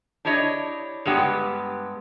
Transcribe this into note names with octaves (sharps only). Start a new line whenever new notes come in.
D4 E4 G4 C#5 D#5
G2 G#3 B3 G4